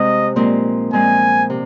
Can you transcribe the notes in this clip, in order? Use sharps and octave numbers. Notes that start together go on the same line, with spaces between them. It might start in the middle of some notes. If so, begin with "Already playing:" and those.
Already playing: C3 G#3 C4 D#5
A#2 F3 G#3 C4
A#2 F3 G#3 C4 G#5
C3